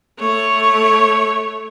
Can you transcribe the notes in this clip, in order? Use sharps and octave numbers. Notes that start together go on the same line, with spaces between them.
A3 C#5